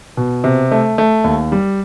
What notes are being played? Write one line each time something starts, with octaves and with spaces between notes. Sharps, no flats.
B2
C3
A3
A3
D#2
G3